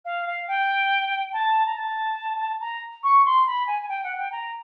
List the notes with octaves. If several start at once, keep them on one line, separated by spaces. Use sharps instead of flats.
F5
F5
G5
A5
A#5
A5
A#5
C#6
C6
B5
G#5
G#5
G5
F#5
G5
A#5